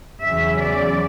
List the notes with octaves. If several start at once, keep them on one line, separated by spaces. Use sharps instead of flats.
E2 C#3 F#3 C#4 E5
D5